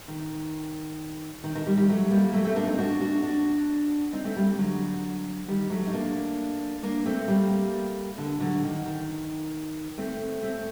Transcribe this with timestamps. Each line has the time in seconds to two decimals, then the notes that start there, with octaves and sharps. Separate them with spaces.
0.08 D#3
1.44 D#3
1.55 D#3
1.66 D#3 G3
1.77 D#3 G3
1.88 F#3 A3
2.10 G3 A#3
2.33 F#3 A3
2.44 A3 C4
2.56 A#3 D4
2.67 C4 D#4
2.79 D4 F#4
3.01 D4 F#4
3.23 D4 F#4
4.13 C4 D#4
4.24 A3 C4
4.36 G3 A#3
4.58 D3 F#3
5.48 D#3 G3
5.70 F#3 A3
5.87 D#4
5.93 A#3 D4
6.83 A#3 D4
7.06 A3 C4
7.28 G3 A#3
8.18 D3
8.40 D3 F#3
8.63 D#3
8.86 D#3
9.98 A3 C4
10.42 A3 C4